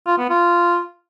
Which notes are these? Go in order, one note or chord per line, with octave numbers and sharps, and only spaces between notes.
F4
B3
F4